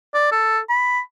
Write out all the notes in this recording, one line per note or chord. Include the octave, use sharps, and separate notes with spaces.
D5
A4
B5